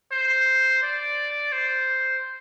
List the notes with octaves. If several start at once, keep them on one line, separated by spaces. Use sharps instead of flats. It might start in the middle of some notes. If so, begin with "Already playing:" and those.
C5
D5
C5